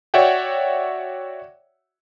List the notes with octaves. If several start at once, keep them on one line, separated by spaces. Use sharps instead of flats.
F#4 C#5 D5 E5 F#5 G5